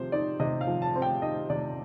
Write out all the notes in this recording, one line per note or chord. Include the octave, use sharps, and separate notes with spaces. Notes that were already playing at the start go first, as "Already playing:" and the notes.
Already playing: C3 F3 C4 C5
D#4 D5
C3 D#5
F5
F3
A5
C4
G5
D#4 D#5
C3 D5